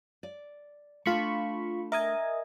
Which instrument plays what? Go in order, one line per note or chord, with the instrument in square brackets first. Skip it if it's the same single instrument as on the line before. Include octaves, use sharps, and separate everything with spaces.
[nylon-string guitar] D5
[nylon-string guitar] A3 D4 [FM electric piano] F4 B5 C#6
[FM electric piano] A#4 D#5 G#5 [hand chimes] E5